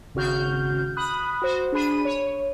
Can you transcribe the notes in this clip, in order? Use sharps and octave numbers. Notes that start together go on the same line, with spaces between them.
G#1 C#3 F#4 F6 G6
B5 D#6 F#6
F#4 C5
D4 G#4 B5 D#7
C#5